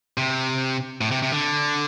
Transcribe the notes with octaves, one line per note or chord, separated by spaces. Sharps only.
C3
A2
C3
C3
D3